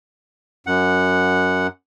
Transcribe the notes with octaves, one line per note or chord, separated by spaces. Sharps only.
F#2 F#5